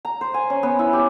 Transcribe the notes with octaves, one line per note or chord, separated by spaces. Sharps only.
A#5
C5
G#5
C#4
B3
E4
G4